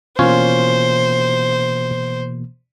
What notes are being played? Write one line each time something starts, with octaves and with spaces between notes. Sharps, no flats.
B2 E3 A#3 C#4 F4 C5 C#5